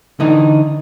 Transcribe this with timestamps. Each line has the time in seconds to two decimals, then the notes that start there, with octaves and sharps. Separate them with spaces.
0.20 D3 E3 D#4